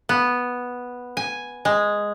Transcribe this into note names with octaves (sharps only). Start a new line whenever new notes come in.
B3
G#5
G#3